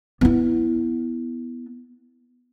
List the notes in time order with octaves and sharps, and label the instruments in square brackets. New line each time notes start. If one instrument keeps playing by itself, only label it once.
[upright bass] B3 E4